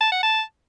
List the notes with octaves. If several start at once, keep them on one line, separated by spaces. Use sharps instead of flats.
A5
F#5
A5